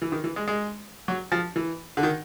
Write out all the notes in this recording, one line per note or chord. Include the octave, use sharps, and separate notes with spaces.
E3
D#3
E3
G#3
G#3
F#3
F3
E3
D3
D#3